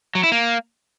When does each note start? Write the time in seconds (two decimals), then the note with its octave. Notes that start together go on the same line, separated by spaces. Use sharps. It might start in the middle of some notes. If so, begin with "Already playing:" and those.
0.15 F#3
0.23 E4
0.32 A#3